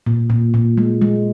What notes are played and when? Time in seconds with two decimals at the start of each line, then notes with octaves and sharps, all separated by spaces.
0.07 A#2
0.30 A#2
0.54 A#2
0.77 G#3
1.02 G#3